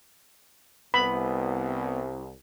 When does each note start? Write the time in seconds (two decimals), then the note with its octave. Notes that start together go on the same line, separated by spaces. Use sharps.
0.94 C2 B3 B5